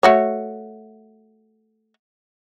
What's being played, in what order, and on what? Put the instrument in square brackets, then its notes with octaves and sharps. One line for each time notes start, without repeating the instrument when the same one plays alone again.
[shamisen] A3 F#4 C#5